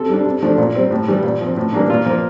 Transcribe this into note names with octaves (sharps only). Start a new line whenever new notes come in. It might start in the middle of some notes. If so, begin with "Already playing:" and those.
Already playing: C3 A4
G3 D4
C3
F3 A3 D4
A#2
G3 C4
A2
E3 G3
A#2
F3 C4
A2
E3 G3 A#3 D4
A#2 F4
F3 A#3